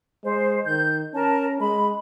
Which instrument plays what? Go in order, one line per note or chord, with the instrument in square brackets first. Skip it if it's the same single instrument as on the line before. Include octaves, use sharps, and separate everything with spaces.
[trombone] G#3 [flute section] C5
[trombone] D#3 [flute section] G6
[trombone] C#4 [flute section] A#4 A5
[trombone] G#3 [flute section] B5